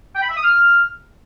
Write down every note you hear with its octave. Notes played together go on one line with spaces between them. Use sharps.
G5
B5
E5
D#6
F6